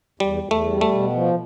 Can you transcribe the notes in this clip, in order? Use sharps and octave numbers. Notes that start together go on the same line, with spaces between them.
E2 G3
E2
A3
G3
A3
B2
F3